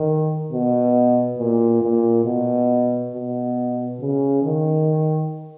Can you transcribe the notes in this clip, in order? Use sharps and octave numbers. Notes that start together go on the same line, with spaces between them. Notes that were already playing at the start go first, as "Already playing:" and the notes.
Already playing: D#3
B2
A#2
A#2
B2
B2
C#3
D#3